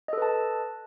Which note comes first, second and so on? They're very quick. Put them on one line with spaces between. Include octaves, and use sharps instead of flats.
D#5 A4 B4 A5